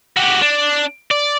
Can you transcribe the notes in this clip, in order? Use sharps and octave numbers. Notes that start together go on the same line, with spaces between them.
F#4 G4
D4
D5